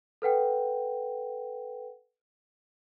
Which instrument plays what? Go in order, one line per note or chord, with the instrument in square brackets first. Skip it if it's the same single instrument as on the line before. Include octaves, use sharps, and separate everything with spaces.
[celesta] A4 B4 F#5 G5